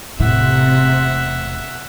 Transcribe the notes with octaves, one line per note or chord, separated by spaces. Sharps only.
E1 A2 C3 E5 F#5